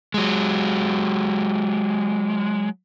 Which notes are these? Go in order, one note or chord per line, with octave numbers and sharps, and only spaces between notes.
F#3 G#3